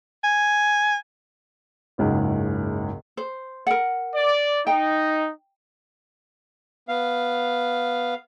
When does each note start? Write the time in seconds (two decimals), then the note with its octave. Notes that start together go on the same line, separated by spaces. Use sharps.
0.24 G#5
1.98 F#1 C#2 G#2
3.17 C5
3.67 A#4 F#5
4.15 D5
4.67 D#4 G5
6.88 B3 F5